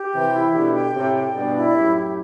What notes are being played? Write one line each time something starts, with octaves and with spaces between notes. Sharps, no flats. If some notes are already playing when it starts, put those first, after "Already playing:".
Already playing: G4
C3 E3 G5
E4
B2 D3 G4
G5
A2 C3 G4
G5
G2 B2 D5
E4
F#2 A2 G4
E4